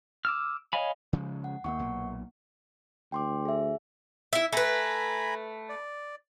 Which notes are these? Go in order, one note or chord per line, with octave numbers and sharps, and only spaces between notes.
D6 E6 F6
C#5 D#5 F5 G#5 B5
C#3 F3 G#3
F#5
D#2 A#3 F#5 C#6
B1 A#2
D2 G5 C6 D6
G#4 E5
E4 E5
A3 B4 G#5 A#5 B5
D5